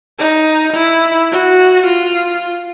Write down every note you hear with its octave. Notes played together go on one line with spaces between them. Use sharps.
D#4
E4
F#4
F4